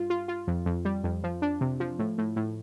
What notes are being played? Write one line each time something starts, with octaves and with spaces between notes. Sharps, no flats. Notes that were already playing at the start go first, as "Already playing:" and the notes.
Already playing: G2 F4
F4
F4
F2
F2
G3
F2
F3
D4
C3
F3
A2
A2
A2